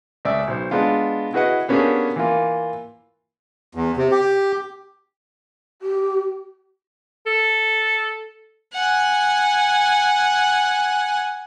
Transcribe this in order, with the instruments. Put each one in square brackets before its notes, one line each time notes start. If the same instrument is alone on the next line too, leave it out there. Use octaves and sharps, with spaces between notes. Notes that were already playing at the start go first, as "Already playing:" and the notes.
[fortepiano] C#2 D5 E5 E6
B1 C5
G#3 B3 D4 F4
E4 F#4 G#4 B4 D#5 F#5
A#3 B3 C#4 D4 G4 G#4
E3 A#3 F4
[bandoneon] E2
C3
G4
[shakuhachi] G4
[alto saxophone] A4
[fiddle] F#5 G#5